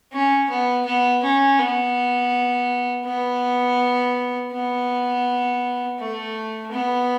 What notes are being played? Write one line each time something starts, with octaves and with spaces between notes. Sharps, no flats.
C#4
B3
B3
C#4
B3
B3
B3
A3
B3